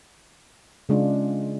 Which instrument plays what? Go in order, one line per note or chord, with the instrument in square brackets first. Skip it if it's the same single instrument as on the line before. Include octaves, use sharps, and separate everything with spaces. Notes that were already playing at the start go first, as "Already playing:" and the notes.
[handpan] C#3 G#3 D4 F4